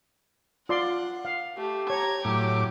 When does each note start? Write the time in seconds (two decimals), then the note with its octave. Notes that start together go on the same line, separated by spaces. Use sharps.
0.69 F4 D5 F#5 C6
1.25 F5
1.57 A3 G4
1.90 C#5 A#5 G#6
2.25 A2 F#3 G4 D6